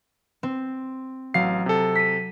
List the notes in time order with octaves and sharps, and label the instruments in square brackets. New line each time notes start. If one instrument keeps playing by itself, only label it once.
[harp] C4
[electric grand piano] A1 F5 C7 [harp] F#3
[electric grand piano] C3 A4
[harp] B6 D#7